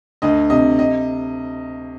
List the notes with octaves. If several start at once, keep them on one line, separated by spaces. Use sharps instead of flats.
D2 D#5
C3 D#5
D#5